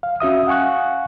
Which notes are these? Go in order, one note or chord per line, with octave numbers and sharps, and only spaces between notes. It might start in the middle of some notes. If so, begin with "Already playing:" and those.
F5
C#4 F#4 E5 D#6
F5 F#5 G#5 C#6 F#6